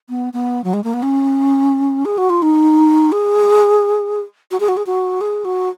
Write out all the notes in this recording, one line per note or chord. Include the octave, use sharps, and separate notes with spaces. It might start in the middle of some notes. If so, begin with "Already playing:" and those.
B3
B3
F#3
G#3
A#3
B3
C#4
G#4
F#4
F4
D#4
G#4
F#4
G#4
F#4
G#4
F#4
G#4
F#4